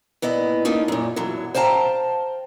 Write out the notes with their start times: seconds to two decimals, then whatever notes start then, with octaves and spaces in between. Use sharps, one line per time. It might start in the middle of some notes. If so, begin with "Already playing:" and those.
0.22 A#2 B3 E4 D#5
0.65 A3 A#3 C#4 D#4 F4
0.88 F#2 A#2
1.16 B2 E3 F#3
1.55 C5 F5 G5 A5 A#5